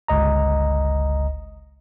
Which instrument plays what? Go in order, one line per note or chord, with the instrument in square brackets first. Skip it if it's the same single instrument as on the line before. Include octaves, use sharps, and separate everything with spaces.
[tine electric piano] G1 C#2 D#5 A#5